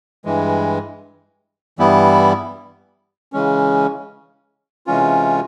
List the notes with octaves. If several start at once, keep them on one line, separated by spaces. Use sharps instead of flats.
G2 E3 G#3
G2 E3 G3 B3 E4
C#3 E3 G#3 C#4
C3 E3 G#3 C#4 F4